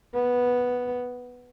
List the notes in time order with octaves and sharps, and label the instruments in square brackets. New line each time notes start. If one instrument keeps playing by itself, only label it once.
[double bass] B3